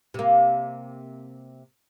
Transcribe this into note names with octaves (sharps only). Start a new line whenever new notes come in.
C3 A#3